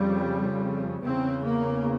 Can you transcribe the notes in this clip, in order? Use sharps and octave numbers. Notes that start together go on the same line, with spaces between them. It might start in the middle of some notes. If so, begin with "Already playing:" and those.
Already playing: F2 C#3 G3
E2 C#3 C4
A#3